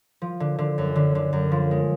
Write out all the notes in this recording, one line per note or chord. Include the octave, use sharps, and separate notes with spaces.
F3
D3
D3
F#2
D3
D3
F#2
F3
G#3